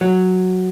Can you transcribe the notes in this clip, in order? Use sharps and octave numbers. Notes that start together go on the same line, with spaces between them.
F#3